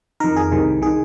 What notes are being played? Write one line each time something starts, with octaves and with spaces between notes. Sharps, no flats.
F2 D#3 A#4
G#4
C2 C3 D#3
D#3 G#4